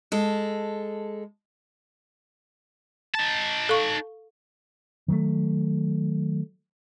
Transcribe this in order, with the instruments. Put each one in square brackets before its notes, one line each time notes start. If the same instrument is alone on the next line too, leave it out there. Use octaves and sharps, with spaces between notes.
[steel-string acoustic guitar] G#3 A4
[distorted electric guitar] D#4 A5
[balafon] A4 F5 C#6
[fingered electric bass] D#3 F#3 G#3 A3